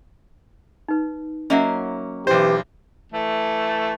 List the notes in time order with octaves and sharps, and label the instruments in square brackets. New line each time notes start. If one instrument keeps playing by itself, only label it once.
[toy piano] D#4 B4
[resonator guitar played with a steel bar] F#3 A#3 C#4 [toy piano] D#5 E5 F#5
[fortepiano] B1 C5 [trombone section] E3 G4
[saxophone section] E3 A3